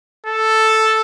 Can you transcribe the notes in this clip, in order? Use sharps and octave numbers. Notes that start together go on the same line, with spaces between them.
A4